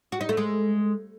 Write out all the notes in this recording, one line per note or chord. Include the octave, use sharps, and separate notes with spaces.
F#4
D#4
A3
G#3